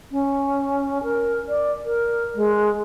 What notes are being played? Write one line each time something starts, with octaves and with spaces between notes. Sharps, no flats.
C#4
A#4
D5
A#4
G#3